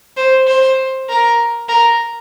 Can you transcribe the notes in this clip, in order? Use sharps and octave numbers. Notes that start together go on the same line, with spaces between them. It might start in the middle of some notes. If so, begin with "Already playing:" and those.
C5
C5
A#4
A#4